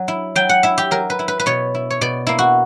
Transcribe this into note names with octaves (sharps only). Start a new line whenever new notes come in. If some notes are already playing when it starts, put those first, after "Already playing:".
Already playing: F#3
E4
F#3 G5
F#5
E4 E5
G4
F#3 A#4
B4
E4
B4
B4
B2 C#5
E4
C#5
B2 D5
A#3 E4
F#4